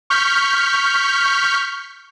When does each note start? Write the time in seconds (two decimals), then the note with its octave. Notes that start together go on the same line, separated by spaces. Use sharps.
0.10 C#6 F6 G6 B6